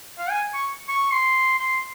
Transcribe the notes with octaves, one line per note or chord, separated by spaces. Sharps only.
F5
G#5
C#6
C#6
C6
C6